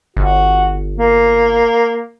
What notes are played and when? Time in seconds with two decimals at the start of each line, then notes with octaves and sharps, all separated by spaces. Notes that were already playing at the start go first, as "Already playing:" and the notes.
0.17 G1 F#4
0.97 A#3